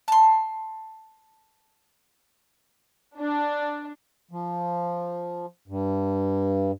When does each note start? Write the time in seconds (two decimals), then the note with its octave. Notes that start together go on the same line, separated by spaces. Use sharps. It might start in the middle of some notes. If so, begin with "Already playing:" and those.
0.08 A5 C6
3.18 D4
4.31 F3
5.68 G2